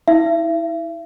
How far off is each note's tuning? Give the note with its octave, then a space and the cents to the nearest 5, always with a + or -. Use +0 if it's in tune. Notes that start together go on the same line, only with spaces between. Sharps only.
E4 -30 E5 +40